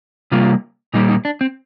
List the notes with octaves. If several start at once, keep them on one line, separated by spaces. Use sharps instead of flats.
C3 G3 A#3 F4
A#2 G3 A#3 D#4
D#4
D4
C4